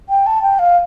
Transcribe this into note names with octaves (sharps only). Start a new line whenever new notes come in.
G5
A5
G5
F5